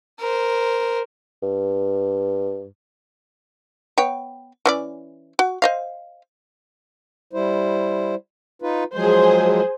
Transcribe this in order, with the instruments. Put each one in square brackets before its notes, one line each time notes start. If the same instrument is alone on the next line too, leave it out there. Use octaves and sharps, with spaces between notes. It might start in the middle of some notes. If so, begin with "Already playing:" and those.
[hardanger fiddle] A#4 C5
[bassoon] G2
[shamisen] B3 C#5 G5
E3 C#4 D5
F#4
C5 D#5 F5
[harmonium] G3 E4 C5
D#4 F4 B4
[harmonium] F3 F#3 G#3 [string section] G#4 C5